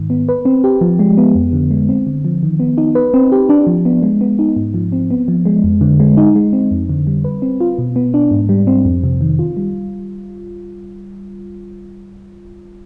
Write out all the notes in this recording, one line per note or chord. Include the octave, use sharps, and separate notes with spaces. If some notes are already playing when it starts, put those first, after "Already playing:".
Already playing: G#2 D#3
B3
B4
C4
G4
F3
G#3
B3
F2
D3
G#3
C4
D3
F3
D#3
B3
D#4
B4
C4
G4
D4
F3
B3
G#3
B3
D#4
G#2
F3
C4
B3
F3
G#3
F2
D3
G#3
D#4
G#3
C4
F2
D3
G3
B4
C4
F4
B2
B3
D4
G#2
G3
C4
F2
C3
D#3
F4
G3